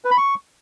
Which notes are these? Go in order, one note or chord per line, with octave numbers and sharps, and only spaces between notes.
B4
B5
C#6